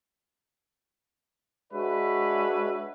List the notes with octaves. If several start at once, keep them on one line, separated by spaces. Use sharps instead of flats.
G#3 D4 F#4 B4 C#5 E5